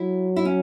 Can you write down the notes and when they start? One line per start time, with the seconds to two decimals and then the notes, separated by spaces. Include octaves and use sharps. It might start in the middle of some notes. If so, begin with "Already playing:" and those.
Already playing: F#3 E4
0.36 E4
0.45 C#4